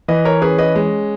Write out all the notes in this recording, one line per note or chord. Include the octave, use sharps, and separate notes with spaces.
E3 B4 D#5
A#4 C#5
C#4 G#4 B4
B4 D#5
G#3